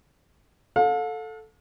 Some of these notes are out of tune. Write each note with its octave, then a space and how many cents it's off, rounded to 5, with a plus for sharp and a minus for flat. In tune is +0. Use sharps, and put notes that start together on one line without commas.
A4 +0 F5 +40